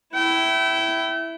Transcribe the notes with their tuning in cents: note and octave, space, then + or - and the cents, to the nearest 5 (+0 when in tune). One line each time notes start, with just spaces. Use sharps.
E4 +0 G5 -35